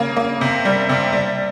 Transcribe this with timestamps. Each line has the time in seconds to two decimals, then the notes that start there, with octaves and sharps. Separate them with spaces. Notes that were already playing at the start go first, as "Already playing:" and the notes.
Already playing: C#3 A#3
0.17 A#3
0.41 C3
0.65 G3
0.89 C3
1.13 G3